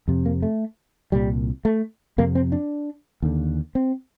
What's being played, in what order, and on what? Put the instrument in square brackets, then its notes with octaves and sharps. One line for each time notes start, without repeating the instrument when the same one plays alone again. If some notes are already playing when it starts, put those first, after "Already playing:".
[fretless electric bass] F2 C3
A#3
A3
C2 A#2 G3
A3
F2 C3 A#3
C4
D4
D#2 D3
C4